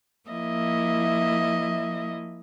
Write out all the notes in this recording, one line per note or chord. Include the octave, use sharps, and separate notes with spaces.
F3 A#3 E4 D#5 E5